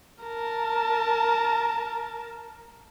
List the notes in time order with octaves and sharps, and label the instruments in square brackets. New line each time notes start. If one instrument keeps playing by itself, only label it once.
[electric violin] A#4 A5